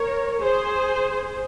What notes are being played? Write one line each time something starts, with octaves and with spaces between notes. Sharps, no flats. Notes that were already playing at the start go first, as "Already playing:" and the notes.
Already playing: A#4 C#5
G#4 C5